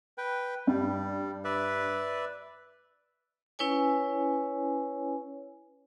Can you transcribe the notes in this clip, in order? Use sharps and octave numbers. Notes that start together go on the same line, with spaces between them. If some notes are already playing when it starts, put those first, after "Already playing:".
B4 G5
G2 G3
B4 D5 E5
C#4 E4 B4 C#5 G#5